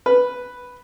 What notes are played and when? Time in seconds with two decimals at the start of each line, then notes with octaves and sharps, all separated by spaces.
0.06 B4